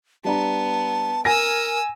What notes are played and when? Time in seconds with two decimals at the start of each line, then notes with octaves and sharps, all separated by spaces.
0.24 G3 B3 D4 A5 A#5
1.25 A#4 G#5 D#6 E6 A#6